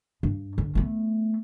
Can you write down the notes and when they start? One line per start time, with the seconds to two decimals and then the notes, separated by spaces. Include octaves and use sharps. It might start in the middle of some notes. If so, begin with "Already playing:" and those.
0.23 G2
0.58 D3
0.75 A3 B3